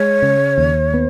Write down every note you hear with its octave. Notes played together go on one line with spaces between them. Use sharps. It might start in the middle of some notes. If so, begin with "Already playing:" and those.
Already playing: G#3 C#5
C#3
D#2
B3